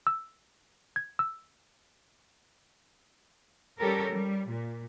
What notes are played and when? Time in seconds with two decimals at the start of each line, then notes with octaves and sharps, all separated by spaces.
0.07 E6
0.96 G#6
1.19 E6
3.79 G3 C#4 G4 A4 A#4
4.13 G3
4.48 A#2